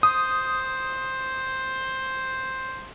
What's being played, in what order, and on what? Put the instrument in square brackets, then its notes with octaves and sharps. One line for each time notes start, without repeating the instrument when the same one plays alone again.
[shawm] C5 [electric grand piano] D#6